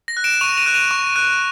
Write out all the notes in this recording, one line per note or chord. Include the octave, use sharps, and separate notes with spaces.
A#6
F#6
D7 E7
C#6 D#7 F7
D#7 F7
F#6
D#7 F7
C#6
F#6